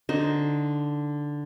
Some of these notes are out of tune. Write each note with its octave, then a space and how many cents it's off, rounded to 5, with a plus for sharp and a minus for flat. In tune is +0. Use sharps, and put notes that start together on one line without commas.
D3 +0 D#4 +0 C5 +0